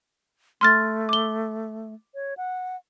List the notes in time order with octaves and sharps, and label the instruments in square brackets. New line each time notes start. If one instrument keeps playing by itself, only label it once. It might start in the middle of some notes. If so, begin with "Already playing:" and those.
[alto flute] A3 [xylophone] C6 F6 A6
[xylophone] D6 G7
[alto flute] C#5
F#5